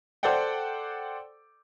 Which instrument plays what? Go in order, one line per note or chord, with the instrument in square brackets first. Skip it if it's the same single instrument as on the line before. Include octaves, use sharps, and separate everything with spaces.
[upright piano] A4 C5 D5 F#5 G5